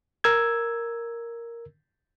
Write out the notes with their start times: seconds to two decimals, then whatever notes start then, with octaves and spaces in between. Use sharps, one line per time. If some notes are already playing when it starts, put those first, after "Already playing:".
0.24 A#4 E6 G#6